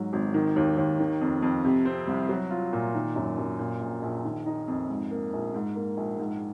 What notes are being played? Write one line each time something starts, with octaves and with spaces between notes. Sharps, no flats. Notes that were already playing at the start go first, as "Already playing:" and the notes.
Already playing: G#2 F#3
G#1
D#3
D#2
D#2
D#3
F2
F2
C3
C4
C2
F#3
F4
A#2
D#3
F#2
F#2
A#2
A#1
A#1
D#3
D#4
F2
G#2
A#3
A#1
G#2
A#3
A#1
G#2